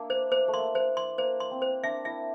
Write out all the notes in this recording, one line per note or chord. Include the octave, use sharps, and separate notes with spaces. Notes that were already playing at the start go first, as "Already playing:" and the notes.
Already playing: A#3 D4 E4
C5
C5
A3
A#3 C6
C5
C6
A#3 C5
C6
C4
C5
D4 E5
E4 E5